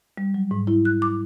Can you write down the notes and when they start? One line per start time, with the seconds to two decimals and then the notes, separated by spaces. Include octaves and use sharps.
0.17 G3
0.34 F#3
0.51 G#2
0.67 E4
0.85 F#6
1.02 D6